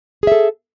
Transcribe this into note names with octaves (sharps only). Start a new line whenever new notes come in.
G#4 A4 E5